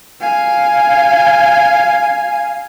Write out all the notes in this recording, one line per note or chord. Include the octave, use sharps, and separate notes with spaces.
F5 G#5